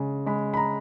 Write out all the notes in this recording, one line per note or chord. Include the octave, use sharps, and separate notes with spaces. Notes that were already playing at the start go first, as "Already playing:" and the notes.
Already playing: C#3 G#3
G#3 B5
B5
A#5